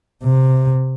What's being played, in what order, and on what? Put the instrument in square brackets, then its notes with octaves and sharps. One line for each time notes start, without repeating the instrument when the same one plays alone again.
[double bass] C3